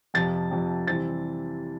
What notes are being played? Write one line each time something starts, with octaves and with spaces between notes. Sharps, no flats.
F2 C3 F3 A6
F2 C3 F3
C3 E3 G3 C4 A6